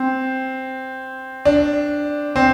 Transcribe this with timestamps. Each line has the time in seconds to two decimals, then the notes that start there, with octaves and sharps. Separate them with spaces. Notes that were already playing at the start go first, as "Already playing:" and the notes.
Already playing: C4
1.45 D4
2.36 C4